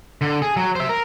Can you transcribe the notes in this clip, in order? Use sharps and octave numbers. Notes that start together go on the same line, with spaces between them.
D3
G#4
F#3
C5 E5
A#4